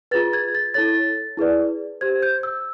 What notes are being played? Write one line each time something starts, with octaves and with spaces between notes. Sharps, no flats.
F4 G#4 B4 A6
G#6
A6
E4 A4 C#5 A6
E4 G#4 B4 D5
G4 C5 G#6
G6
E6